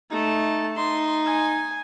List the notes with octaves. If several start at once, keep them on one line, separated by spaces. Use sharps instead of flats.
A3 D#4 A5
D#4 C6
G#5